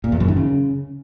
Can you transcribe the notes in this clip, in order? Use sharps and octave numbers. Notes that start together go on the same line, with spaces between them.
A#2
E2
F#2
D#3
C#3